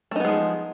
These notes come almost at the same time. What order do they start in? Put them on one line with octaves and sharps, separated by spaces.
A3 D#4 B3 G#3 F3